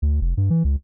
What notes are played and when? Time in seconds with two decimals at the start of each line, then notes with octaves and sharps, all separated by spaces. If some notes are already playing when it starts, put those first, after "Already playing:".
0.02 D2
0.21 F1
0.37 G2
0.50 E3
0.64 C#2